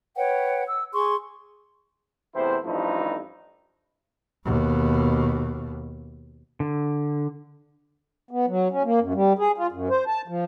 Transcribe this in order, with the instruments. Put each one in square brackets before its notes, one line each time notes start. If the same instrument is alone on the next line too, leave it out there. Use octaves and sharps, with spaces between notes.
[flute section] B4 C#5 F#5 G5
E6
G#4 C6 C#6
[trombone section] E2 A2 C3 E4 C5
A1 G2 F3 A3 D#4 E4
[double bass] D#2 B2
[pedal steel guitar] D3
[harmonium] B3
F#3
C#4
A#3
F#2
G3
G#4
F4
F#2
C5
A5
F3